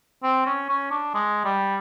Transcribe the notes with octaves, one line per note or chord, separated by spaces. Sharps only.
C4
C#4
C#4
D4
G#3
G3